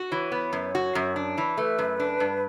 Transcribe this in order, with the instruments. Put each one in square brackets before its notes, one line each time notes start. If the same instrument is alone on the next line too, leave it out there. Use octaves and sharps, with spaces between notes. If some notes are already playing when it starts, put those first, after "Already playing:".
Already playing: [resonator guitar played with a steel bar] F#4
[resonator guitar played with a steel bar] E3 [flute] C#5
[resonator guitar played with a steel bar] B3
F#2
F#4
F#2
D4
E3
[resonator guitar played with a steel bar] A3 [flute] B4
[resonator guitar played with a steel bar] F#2
D4
G2